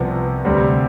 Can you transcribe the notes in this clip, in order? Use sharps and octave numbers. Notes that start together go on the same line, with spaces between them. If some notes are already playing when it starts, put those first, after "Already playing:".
Already playing: C2 C3 F3 B3
D2 C3 G3 C4